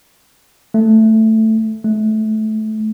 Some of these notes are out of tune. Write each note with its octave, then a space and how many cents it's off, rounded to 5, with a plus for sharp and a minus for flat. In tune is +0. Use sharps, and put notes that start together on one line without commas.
A3 +5
A3 -20